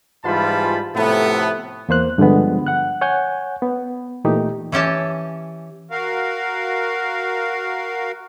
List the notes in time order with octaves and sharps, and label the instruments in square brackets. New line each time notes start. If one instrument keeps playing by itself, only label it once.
[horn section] G#2 E3 G3 F4 A5 B5
A2 C3 F3 A3 B3
[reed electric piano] E2 A#3 C5 F#6
G2 D3 F3 G#3 B3
F#5 F#6
C#5 F#5 G#5 G6
B3
A#2 E3 A3 D#4 G4
[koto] E3 C#4 G4 A5
[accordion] F#4 A#4 F5